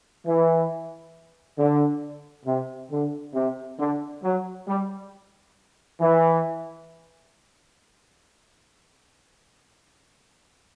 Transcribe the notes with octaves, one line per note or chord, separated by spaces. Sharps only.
E3
D3
C3
D3
C3
D3
F#3
G3
E3